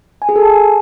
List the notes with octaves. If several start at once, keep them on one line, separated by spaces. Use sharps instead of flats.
G#5
G#4
A4
A5
G#5